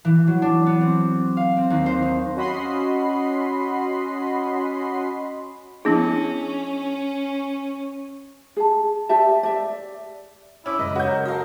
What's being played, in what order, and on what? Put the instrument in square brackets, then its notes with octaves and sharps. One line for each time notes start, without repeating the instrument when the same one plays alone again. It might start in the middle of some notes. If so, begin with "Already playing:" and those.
[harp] E3
F#3
D4
B3
C4
F5
C4
D#2
C5
D#4
[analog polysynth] C#4 F#4 D#5 B5 C6 C7
[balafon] F3 B3 E4 [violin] C#4 [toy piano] D4 G#4
[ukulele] G#4 A5
G4 D5 E5 A5
D5 E5
[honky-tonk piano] C#4 D6 [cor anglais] E4
[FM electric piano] F#2 C#3 G#3 [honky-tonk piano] B4 [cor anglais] D#5
[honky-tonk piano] F#4 G6 [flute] C#5
[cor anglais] A#4
[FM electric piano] F#4 A4 [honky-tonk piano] D#5 F5